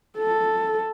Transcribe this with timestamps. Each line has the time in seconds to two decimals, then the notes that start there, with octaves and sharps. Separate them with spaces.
0.17 A4